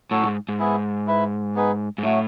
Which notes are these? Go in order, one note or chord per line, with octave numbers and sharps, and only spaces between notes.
A2 F#3 C#4 F#4 A4
G#2
G#2
B3 E4 G#4
E4 B4 E5
B3 D#4 G#4 B4
G#2
A2 F#3 A3 C#4 F#4